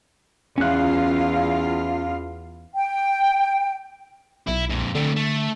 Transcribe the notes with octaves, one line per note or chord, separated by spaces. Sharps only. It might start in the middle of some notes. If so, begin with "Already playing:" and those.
E2 C#4 F4 F5 F#6
G5
B1 E4
F2 A#2
D3 A3 C4
A3